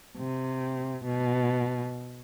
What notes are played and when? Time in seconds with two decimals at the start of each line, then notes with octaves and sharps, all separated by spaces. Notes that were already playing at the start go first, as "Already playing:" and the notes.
0.18 C3
1.05 B2